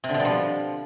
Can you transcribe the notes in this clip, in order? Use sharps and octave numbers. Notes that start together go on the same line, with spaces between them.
C3
D3
B2
G3
F3